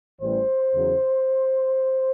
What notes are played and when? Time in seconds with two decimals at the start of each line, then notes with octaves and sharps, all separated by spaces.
0.20 A1 A2 E3 G3 C5
0.73 E2 C#3 F#3